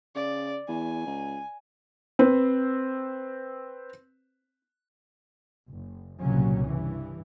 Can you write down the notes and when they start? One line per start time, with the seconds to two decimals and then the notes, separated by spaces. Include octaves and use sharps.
0.16 C#3 D5
0.68 E2 G#5
1.06 C#2
2.19 C4 B4 C5
5.69 F#1
6.20 C2 A#2 C#3 F#3 C#4
6.66 G2 E3